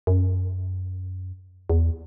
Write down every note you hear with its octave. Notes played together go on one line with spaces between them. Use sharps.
F#2
E2